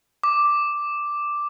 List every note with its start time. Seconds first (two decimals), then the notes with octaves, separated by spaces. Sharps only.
0.23 D6